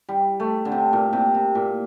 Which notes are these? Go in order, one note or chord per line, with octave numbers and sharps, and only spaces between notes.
G3
A3
D3
C3
A#2
C3
C3
A#2